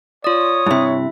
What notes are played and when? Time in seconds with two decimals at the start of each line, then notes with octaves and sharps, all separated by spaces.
0.24 F4 C#5 D5 D#6
0.66 G2 C3 E4 E5